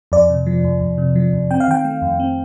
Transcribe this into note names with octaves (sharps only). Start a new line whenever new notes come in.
F2 D5
C3
F3
F2
F2
C3
F3
F2
C4 G5
F5
D#3 G5
A3
F2
C4